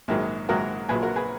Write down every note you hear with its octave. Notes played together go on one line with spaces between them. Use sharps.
A#1 G#2 D#3 F#3
A#1 G#2 D#3 F#3 F#4 A#4
A#1 A#2 F#3 G#4 B4
F#4 A#4
G#4 B4